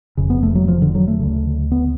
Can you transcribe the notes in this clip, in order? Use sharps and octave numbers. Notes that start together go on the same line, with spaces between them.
F1 F2 C#3
B3
A3
F#3
F3
D3
F#3
A3
D2 C#3
B3